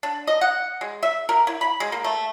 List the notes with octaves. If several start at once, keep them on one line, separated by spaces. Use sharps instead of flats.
D4
D#5
F#5
G#3
E5
A#4
E4
B5
G#3
A#3
A3